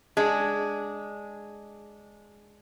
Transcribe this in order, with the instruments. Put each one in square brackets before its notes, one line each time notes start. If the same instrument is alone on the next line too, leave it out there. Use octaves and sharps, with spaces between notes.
[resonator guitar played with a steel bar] G#3 D4